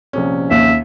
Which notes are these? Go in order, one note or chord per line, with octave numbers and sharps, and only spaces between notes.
A#1 C3 C#4
D#2 E5